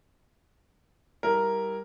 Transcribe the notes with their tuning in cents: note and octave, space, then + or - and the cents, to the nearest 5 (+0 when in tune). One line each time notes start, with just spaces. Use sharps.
G3 +0 E4 -5 A#4 +0